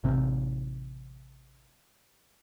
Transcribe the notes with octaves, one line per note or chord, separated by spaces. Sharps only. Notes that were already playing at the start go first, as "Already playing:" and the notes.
A1 C3 C4